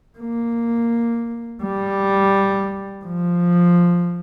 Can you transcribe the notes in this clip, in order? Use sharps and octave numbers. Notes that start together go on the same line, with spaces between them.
A#3
G3
F3